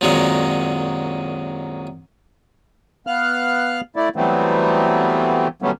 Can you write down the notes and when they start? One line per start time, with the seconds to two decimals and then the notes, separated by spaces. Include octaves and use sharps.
0.01 C2 F#2 A#2 D#3 F#3 G#3
3.07 B3 F5 F6 F#6
3.96 A3 E4 D5
4.16 E3 F#3 G3 A3 B3 C4
5.62 D3 F#3 G3 A3 B3 C#4